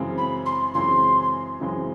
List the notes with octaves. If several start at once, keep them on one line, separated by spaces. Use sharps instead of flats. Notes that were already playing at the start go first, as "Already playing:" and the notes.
Already playing: F#2 C#3 E3 G#3 C4
B5
C6
F#2 C#3 E3 G#3 C4 C6
F#2 C#3 E3 G#3 C4